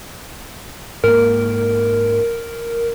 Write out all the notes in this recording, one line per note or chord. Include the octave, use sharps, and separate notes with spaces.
G#2 A#3 A#4